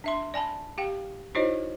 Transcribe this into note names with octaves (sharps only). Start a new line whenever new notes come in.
D4 E5 C6
D5 G#5 A5 B5
G4 F5 G5
D#4 E4 F#4 C5 C#5 D#5